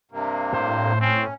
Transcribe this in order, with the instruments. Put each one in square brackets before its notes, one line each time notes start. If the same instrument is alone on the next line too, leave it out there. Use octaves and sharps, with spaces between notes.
[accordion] G2 C3 A#3
[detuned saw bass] A2 [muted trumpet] C5
[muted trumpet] C4 [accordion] C#4